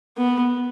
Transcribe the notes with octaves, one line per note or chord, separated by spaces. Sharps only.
B3